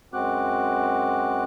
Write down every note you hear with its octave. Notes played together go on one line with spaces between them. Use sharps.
F#2 G#3 C4 F#4 D6 F#6